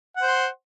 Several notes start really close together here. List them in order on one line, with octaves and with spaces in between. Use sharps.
F#5 C5 C6